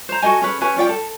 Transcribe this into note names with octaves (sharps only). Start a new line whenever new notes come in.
C5 A#5
F#4 A4 D#5 G#5
C#4 G#4 B4
C#4 G4 B4 G#5
C#4 F4 D5 G5
A4